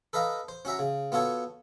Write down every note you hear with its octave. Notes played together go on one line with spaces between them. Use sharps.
A4 B4 D#5 F5 A#5
C5
C#4 F#4 E5 A#5
C#3
B3 F4 F#4 A4 C#5